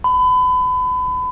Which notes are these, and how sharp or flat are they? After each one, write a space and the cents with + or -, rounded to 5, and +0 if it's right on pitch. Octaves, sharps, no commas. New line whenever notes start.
B5 +30